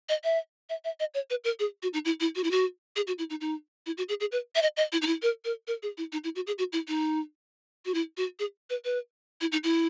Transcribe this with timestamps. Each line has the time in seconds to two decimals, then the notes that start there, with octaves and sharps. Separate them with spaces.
0.09 D#5
0.24 E5
0.70 E5
0.84 E5
1.00 D#5
1.14 C#5
1.30 B4
1.44 A#4
1.60 G#4
1.83 F#4
1.94 D#4
2.05 E4
2.20 E4
2.36 F#4
2.44 E4
2.51 F#4
2.96 G#4
3.07 F#4
3.19 E4
3.30 D#4
3.41 D#4
3.86 E4
3.98 F#4
4.09 G#4
4.20 G#4
4.32 B4
4.55 E5
4.62 D#5
4.77 D#5
4.92 E4
5.02 D#4
5.07 E4
5.22 A#4
5.45 A#4
5.67 A#4
5.83 G#4
5.98 E4
6.12 D#4
6.24 E4
6.36 F#4
6.47 G#4
6.59 F#4
6.73 E4
6.88 D#4
7.86 F#4
7.94 E4
8.17 F#4
8.39 G#4
8.70 B4
8.85 B4
9.41 E4
9.52 D#4
9.64 E4